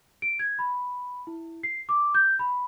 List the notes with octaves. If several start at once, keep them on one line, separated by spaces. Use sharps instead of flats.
D7
G#6
B5
E4
C7
D6
G6
B5